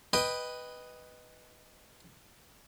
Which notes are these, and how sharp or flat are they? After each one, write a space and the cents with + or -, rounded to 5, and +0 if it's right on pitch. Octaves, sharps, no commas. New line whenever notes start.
B4 +0 D#5 +0 G5 +15